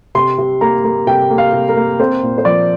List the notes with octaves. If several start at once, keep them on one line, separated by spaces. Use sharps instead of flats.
C3 C6
C3
A#3 A#5
A#3
C3 G5
A#3
F5
C3
A#4
A#3
C4 C5
A#2
C5
F3 D5